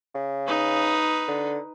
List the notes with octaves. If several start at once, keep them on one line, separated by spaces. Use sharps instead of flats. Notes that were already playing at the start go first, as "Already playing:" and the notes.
C#3
D#4 B4
D3